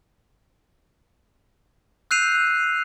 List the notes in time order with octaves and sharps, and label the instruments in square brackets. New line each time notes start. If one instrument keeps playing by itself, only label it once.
[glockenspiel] E6 F#6 G6 C7 D#7 F7